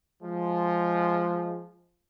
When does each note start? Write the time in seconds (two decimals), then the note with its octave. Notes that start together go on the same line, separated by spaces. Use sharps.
0.23 F3 G#3